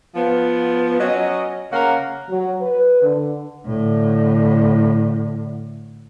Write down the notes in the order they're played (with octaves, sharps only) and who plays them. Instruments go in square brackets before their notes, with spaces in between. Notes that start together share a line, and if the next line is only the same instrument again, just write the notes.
[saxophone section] F3 B3
F#3 C#4 D#5
C#3 A#3 C#4 A#4 F5 F#5
[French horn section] F#3
B4
D3
[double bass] A2 D3